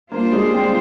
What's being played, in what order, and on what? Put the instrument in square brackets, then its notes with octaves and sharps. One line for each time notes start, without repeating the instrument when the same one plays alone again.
[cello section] G3 D4 F4 C5 [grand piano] A#3
[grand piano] G#3
C4